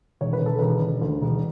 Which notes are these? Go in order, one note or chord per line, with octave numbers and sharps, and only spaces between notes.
E1 C#5
B4
E1 A4
E1 B4
E1
D2
E1